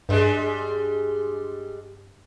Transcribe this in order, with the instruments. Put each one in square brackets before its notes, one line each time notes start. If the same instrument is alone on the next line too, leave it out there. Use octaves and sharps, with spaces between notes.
[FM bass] G2 [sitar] G3 G#3 D4